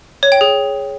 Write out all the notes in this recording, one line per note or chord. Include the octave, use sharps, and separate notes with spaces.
C#5
G5
G#4